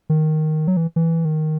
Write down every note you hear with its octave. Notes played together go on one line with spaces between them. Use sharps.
D#3
F#3
E3
E3
D#3